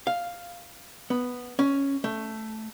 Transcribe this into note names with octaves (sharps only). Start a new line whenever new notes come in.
F5
B3
C#4
A3